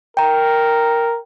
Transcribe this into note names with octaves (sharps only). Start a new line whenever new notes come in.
A#4 G5 A#5